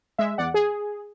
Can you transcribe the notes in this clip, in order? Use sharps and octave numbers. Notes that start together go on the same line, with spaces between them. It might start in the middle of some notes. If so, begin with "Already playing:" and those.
G#3 E5
E2 D5 F#5
G#4